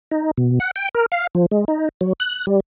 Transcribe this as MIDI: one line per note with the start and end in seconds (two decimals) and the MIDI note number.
0.11 0.31 63
0.37 0.59 47
0.60 0.71 78
0.76 0.89 79
0.95 1.06 70
1.12 1.27 77
1.35 1.46 53
1.51 1.65 56
1.68 1.89 63
2.01 2.13 54
2.20 2.46 90
2.47 2.60 55